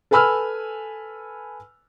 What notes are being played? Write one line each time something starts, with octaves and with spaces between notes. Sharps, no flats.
A4 B4 G#5 B5 E6 F6